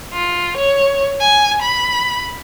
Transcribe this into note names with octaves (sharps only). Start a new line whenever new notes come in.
F4
C#5
G#5
B5